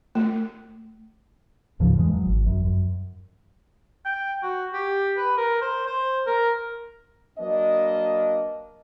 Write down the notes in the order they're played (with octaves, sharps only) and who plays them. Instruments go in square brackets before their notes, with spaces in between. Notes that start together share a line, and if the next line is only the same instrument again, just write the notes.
[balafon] A3
[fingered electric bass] C#2 G#2 C#3 F3
F2 E3 G3 G#3
F#3
G#1
F#2
F#2
[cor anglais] G5
F#4
G4
B4
A#4
C5
C5
A#4
[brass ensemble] F#3 A#3 D4 B4 D#5